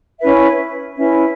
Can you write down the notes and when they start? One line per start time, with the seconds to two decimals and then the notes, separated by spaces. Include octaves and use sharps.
0.19 C#4 E4 B4 E5
0.97 C#4 E4 B4 E5